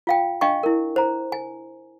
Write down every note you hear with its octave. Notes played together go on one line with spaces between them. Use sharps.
F4 F5 G5
D4 D#5 F5 G5 G#5 C#6
E4 A#4
C5 A#5
G#5